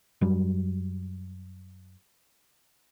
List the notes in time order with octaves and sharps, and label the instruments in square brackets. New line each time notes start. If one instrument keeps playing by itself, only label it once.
[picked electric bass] F#2 F#3 G3